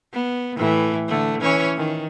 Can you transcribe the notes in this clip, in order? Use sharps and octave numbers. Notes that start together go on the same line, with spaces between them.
B3
A2 E3
D3 A3
E3 C#4 C#5
D#3